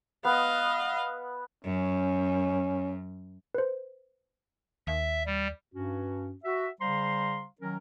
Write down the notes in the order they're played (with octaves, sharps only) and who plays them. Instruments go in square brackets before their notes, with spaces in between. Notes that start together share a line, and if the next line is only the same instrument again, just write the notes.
[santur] B3 [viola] D#5 F5
[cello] F#2 [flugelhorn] C#4
[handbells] B4 C5
[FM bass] D#2 [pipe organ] E5
[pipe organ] G3
[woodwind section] G2 C#4 F#4
F#4 E5
C#3 G3 C5 F5 A#5 C6
D#3 F#3 C#4 A#4